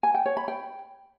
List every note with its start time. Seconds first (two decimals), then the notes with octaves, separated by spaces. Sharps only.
0.03 G#5
0.14 G5
0.26 C#5
0.37 B5
0.48 G5